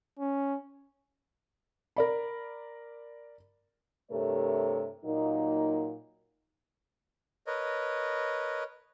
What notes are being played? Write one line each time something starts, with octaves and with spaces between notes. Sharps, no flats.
C#4
A#4 D5 B5
G2 C3 A3 A4 A#4 C#5
A#2 F#3 A#3 D#4
A#4 B4 C#5 D#5